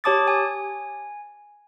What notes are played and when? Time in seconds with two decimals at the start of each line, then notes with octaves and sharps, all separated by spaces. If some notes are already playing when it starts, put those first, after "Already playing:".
0.04 G4 C#5 A5 D6 D#6 A6
0.28 G#5